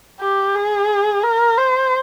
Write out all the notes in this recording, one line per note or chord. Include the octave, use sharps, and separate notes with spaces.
G4
G#4
A#4
C5